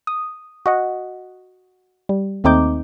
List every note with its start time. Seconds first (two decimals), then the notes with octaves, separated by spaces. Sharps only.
0.07 D#6
0.66 F#4 D#5 F#5
2.09 G3
2.44 D#2 A3 C4 D#4 D6 G6